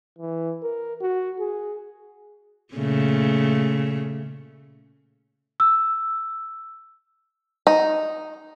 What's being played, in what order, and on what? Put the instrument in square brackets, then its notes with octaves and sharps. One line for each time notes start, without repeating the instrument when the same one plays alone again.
[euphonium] E3
A#4
F#4
G#4
[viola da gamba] A#2 C#3 A3
[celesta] E6
[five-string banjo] D#4